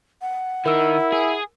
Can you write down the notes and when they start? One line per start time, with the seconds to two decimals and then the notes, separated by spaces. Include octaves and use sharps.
0.22 F#5
0.66 D#3 D#4 E4 A#4 E6
1.12 G#4